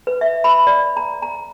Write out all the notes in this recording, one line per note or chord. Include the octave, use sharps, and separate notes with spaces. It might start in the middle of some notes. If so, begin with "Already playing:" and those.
B4
E5
B5
D5
A#5
A#5